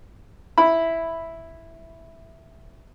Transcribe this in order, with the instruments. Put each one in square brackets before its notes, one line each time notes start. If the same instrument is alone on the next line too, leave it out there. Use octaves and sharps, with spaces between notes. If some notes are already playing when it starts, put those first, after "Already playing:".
[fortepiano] E4 B5